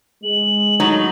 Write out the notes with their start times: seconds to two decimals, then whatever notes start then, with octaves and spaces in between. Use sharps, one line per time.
0.24 G#3 F#7
0.80 A2 F#3 D#4